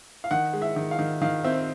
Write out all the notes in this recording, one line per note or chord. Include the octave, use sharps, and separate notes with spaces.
F5
D#3 F#5
G#3
E5
D#3
F5
D#3
D#3 F5
C4 E5